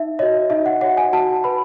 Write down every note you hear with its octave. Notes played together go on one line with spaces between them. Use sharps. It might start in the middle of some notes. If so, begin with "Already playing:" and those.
Already playing: D#4 E5
F#4 C#5 D#5
D#4 E5
F#5
F#4 C#5 F#5
G#5
F#4 A5
B4 B5